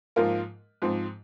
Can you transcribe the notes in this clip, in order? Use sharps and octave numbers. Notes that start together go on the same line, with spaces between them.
G#2 F3 A#3 F4 A#4
G#2 F3 C4